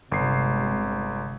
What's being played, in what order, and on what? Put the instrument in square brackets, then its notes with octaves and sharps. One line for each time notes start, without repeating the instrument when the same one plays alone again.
[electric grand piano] G1 C7 [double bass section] C3 G#3